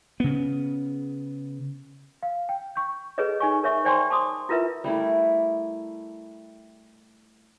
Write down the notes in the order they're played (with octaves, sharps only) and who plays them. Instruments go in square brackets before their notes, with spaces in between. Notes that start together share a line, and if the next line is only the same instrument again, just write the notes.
[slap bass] C#3 B3
[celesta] F5
G5
C#6 G6
[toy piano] G#4 A4 B4 C#5 D#5
D#4 G#5 C#6
A#4 C#5 E5 C#6
C5 D5 G5 G#5 C6 C#6
A5 C6 D6 D#6
E4 F4 A#4 B4 E5
[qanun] G3 A3 E4 A#4